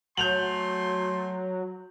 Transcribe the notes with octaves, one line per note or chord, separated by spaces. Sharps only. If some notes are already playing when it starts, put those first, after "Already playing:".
F#3 A3 G#5 C6 G6 F7 F#7